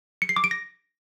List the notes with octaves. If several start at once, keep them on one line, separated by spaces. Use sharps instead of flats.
C#7
C7
D6
D7
A#6